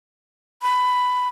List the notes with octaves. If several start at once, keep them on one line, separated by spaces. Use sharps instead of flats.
B5